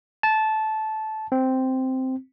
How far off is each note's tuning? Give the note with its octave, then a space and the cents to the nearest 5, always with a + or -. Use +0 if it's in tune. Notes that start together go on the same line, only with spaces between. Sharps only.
A5 -15
C4 -5